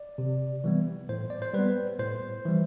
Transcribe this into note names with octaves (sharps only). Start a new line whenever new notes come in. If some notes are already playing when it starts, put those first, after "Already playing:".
Already playing: D5
C3
E3 G3 B3
A2 C5
D5
C5
G3 B3 B4
A2 C5
E3 G3